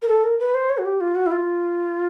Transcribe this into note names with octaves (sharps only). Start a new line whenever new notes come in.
A#4
A4
A#4
B4
C5
C#5
F#4
G4
F4
F#4
E4
F4